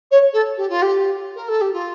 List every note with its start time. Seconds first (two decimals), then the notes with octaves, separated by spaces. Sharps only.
0.11 C#5
0.33 A4
0.57 G4
0.69 F4
0.81 G4
1.35 A#4
1.48 A4
1.61 G4
1.72 F4